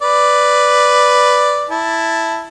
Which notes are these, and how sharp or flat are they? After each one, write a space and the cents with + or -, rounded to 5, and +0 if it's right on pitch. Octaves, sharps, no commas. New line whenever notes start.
B4 +0 D5 +0
E4 +0 A5 +0